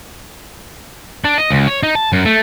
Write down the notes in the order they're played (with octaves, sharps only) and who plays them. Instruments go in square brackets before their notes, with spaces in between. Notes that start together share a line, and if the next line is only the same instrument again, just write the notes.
[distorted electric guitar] D4
D#5
C#2
C#5
D#4
A5
F#2
A3